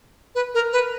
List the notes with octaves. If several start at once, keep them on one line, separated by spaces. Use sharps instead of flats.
B4
A#4
B4